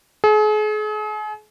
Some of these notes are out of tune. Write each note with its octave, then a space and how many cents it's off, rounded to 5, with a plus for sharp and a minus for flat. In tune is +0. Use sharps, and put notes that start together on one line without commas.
G#4 +40